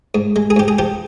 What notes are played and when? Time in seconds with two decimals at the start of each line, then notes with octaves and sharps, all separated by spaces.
0.15 G#2
0.36 G#3
0.50 G#4
0.56 G#2 G4
0.68 G#4
0.79 F3 G4